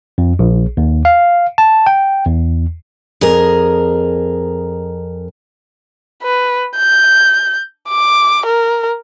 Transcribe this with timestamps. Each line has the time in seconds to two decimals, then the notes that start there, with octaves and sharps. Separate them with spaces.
0.18 F2
0.39 A#1
0.77 D#2
1.05 F5
1.58 A5
1.87 G5
2.26 E2
3.21 F2 G#4 A#4
6.23 B4
6.77 G6
7.89 D6
8.46 A#4